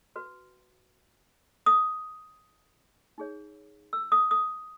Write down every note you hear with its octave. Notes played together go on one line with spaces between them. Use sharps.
F#4 B4
D#6
D#4 G#4 C#5
E6
D#6
D#6